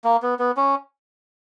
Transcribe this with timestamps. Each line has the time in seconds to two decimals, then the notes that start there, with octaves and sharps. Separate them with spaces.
0.04 A#3
0.22 B3
0.39 B3
0.57 C#4